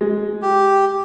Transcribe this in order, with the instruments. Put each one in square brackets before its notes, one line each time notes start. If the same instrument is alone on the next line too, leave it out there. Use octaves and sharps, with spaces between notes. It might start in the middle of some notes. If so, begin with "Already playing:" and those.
[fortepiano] G#3
[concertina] G4